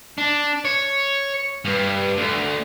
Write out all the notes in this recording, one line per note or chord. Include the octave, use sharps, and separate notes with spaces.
D4
C#5
G2
D2